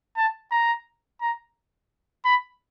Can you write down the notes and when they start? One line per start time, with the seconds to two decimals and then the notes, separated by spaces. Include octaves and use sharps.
0.17 A5
0.51 A#5
1.21 A#5
2.25 B5